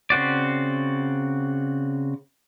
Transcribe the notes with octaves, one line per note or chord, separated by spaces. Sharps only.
C#3 C4 F#4 D5